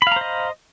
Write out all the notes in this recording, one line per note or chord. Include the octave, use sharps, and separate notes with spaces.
C5 D#5 F5 A#5 B5